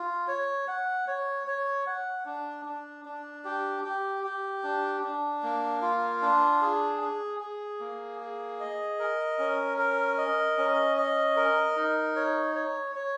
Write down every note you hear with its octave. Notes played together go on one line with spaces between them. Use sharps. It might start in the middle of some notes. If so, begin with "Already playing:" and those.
Already playing: F4
C#5
F#5
C#5
C#5
F#5
D4
D4
D4
G4
G4
G4
D4
D4
A#3
F4
D4
G#4
G#4
G#4
A#3
G#4
D#5
A#4
C#4
A#4
D#5
C#4
D#5
A#4
D#4
C#5
C#5
C#5